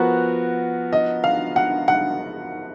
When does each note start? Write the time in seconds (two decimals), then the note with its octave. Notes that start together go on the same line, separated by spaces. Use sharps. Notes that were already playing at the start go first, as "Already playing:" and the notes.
Already playing: F3 B3 F#4 A#4
0.93 D#5
1.24 F5
1.56 F#5
1.88 F#5